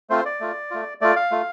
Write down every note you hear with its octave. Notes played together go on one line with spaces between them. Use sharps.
A3 C4 F4 C5
D5
A3 F4
A3 F4
A3 F4 D5
F5
A3 F4